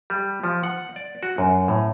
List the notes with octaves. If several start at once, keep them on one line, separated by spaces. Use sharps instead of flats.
G3
F3
F#5
D5
F#4
F#2
A2